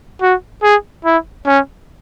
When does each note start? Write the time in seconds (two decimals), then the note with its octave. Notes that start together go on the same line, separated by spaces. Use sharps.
0.22 F#4
0.63 G#4
1.05 E4
1.46 C#4